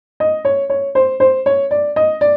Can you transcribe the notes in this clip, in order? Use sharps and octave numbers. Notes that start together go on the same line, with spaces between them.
D#5
C#5
C#5
C5
C5
C#5
D5
D#5
D5